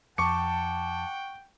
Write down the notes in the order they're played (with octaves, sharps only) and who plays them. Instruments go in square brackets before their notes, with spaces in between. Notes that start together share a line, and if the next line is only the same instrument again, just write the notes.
[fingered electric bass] F2 [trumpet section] F#5 G5 [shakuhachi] A5 [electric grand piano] C#6 D6 C#7